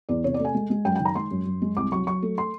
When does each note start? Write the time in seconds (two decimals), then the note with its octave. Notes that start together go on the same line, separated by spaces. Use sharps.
0.09 E2 D5
0.24 C3 C#5
0.34 D5
0.40 A3
0.45 G#5
0.54 G#3
0.70 G#3
0.85 F#2 G5
0.96 G5
1.00 D#3
1.05 A#5
1.15 G#3 C6
1.31 F#2
1.46 F#2
1.62 G#3
1.77 C2 D6
1.92 F#3 C#6
2.07 F#3 C#6
2.22 A3
2.38 C6